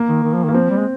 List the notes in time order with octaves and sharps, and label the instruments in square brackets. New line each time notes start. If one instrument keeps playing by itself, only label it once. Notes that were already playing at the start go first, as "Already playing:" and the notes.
Already playing: [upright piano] A#3
[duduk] D#3
D#3
F3
D#3
[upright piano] A#3
[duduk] F3 [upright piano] C4
[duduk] G3
G#3